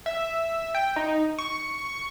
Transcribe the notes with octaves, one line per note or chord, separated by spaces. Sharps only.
E5
G5
D#4
C#6